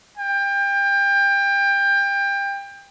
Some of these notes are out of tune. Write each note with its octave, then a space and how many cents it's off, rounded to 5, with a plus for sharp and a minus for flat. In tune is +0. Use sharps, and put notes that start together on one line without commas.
G5 +25